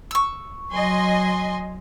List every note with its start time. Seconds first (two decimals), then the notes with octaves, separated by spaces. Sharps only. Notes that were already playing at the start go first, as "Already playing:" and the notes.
0.11 C#6 E6
0.71 F#3 D#5 G#5 C6